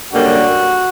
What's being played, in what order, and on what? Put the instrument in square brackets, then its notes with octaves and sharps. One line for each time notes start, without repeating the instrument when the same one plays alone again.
[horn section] F#2 D3 G3 A#3 F#4